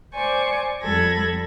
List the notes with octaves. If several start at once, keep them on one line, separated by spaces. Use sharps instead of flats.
C5 D5 G#5 C#6 D6
F2 G3 A4 B5 G#6 A#6